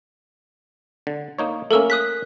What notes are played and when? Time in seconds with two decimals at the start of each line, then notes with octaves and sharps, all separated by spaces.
1.07 D3
1.39 A#3 D#4 C#5
1.71 A3 A#3 C#4 A4 A#4 E6
1.90 D#6 F#6 B6